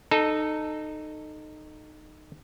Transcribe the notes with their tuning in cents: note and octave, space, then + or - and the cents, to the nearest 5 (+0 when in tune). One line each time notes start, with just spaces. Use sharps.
D#4 -20 A4 +0